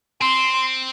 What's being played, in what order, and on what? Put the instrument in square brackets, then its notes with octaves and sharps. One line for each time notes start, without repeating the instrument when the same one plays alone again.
[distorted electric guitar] C4 [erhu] C6